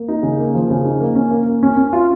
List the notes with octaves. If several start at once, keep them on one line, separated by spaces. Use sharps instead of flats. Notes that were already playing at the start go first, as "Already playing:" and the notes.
Already playing: A#3
D#4
C#3
A#3
F3
C#3
D#4
A#3
C#4
A#3
A#3
C#4
C#4
F4